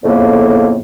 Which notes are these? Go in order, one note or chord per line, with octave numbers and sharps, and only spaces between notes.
F2 A2 C#3 A#3 B3